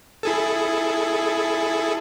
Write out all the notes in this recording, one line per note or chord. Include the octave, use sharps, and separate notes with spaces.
E4 G#4 A4